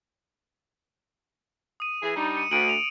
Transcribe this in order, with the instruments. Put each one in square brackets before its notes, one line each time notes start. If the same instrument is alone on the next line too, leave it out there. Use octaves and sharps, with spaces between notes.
[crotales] D#6 D#7
[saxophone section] E3 G#4
G3 D4 D#4
[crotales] C#7 D#7
[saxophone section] D2 [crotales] D7 D#7 F#7
[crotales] F7